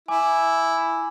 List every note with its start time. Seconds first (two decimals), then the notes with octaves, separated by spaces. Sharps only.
0.08 E4 G#5 D6